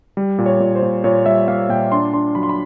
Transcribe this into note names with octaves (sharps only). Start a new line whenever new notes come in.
G3
A#2
C#5
A#2
C5
A#2
A#2 C#5
G3 E5
A#3 F5
A#2 G5
D4 C6
D4 C6
F#3 B5
C6
B5